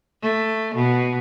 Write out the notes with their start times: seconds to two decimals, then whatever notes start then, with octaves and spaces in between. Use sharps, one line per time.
0.22 A3
0.75 B2